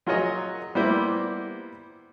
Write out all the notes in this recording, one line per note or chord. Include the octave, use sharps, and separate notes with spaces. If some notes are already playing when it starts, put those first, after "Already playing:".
F#3 F4 G#4 A#4 C#5 D#5
G3 A#3 B3 E4 C5